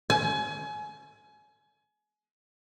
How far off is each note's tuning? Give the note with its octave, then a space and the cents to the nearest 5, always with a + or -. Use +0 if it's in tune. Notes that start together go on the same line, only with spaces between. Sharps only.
G#5 +30